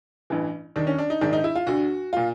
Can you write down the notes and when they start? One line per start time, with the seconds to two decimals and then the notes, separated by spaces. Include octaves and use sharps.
0.30 A1 G2 E3
0.76 D#2 D#3 D4
0.87 C#4
0.98 D4
1.10 D#4
1.21 A#1 G#2 D#3 D4
1.33 D#4
1.44 E4
1.55 F4
1.67 D2 D3 F#4
2.13 A#2 F4